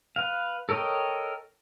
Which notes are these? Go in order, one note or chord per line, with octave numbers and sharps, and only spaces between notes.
B4 F5
A4 A#4 C#5 D#5 G5